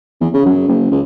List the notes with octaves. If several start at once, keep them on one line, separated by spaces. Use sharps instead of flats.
E2
C#3
F#2
F#1
C#2